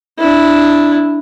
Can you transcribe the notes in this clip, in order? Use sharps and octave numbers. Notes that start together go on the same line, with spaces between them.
D4 E4